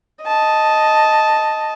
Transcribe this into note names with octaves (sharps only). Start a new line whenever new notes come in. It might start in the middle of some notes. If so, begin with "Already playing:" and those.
D#5 A5